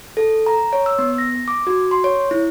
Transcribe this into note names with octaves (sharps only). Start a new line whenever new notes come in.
A4
A#5
C#5
E6
B3
A#6
D6
F#4
C6
C#5
E4